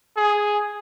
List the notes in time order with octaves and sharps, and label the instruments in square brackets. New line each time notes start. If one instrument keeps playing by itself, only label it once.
[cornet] G#4